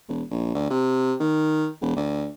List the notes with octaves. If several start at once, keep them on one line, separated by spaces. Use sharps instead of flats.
E1
A#1
D2
C3
D#3
E1
D2